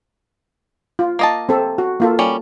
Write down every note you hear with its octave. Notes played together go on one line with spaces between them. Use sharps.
F4
A#3 D#5 A5
C4 A4
F#4
A#3 F4 A4
G3 C#4